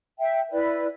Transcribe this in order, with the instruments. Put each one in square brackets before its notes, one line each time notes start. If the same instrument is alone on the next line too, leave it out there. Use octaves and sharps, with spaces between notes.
[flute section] E5 G5
E4 B4 D5